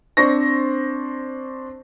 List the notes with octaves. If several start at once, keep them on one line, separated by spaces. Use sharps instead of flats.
C4 D4 C5 C#6 A#6